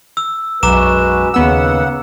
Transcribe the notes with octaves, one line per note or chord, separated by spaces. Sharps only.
E6
B1 F#2 G#3 F#4 B4 A#5 D6 E7
D#2 C#3 B3 F#5 E6